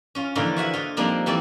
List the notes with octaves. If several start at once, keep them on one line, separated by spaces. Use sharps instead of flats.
C#4 F4
A#2 D3 E3 F3 D#4 F4
F#4 E5 F#5 G#5
F4 D#5
F3 G3 A#3 C4 D4 D#4
E3 G3 C4 A4 D5